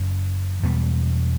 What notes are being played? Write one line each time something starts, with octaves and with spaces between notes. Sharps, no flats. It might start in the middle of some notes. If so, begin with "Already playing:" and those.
Already playing: F#1 F#2
E2 B2 G3